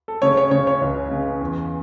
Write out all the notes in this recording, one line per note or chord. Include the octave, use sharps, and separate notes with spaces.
A4
C#3 C#5
C#5
C#3 C#5
C#5
C#2
C#3
E2